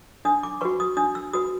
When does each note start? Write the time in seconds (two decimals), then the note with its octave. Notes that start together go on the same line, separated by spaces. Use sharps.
0.25 D4 D#6
0.43 D6
0.61 F#4 B4 C#6
0.80 D#6
0.97 D4 D#6
1.15 E6
1.33 F#4 B4 D#6